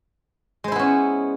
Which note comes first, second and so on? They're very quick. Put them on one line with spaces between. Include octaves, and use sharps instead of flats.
G#3 C5 E4 B3 C#4